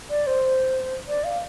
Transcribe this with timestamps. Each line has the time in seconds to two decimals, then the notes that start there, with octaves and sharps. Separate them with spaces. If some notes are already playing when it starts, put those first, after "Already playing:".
0.10 D5
0.27 C5
1.08 D5
1.24 F5